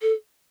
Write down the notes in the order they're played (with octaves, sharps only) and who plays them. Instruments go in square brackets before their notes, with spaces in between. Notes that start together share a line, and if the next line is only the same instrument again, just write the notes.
[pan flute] A4